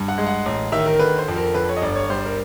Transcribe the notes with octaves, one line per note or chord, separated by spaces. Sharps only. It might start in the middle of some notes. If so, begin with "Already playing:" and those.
Already playing: G2
F#5
G#3
F#5
A1
D#3 E5
A#4
D3 B4
C5
F2
A#4
D3 B4
C#5
D#5
G1 D5
C#5
G3 C5
A#4